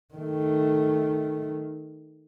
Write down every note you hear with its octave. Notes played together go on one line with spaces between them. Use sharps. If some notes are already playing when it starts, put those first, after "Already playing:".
D#3 A3